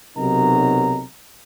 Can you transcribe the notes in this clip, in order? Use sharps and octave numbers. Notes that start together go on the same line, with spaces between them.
B1 C3 F#3 D#4 A#4 A#5